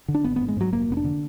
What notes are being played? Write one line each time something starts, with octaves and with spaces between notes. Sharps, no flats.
D3
D4
G#1 B3
B3
G#2
G#3
G#2 F#3
F1 A#3
F1 B3
D4
D3